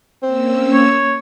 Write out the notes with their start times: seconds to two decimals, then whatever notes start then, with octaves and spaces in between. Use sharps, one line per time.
0.23 A#3 C4 C#4 E6
0.73 C#5